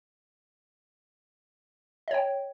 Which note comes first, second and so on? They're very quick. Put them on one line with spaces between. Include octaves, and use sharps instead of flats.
D#5 C#5 G5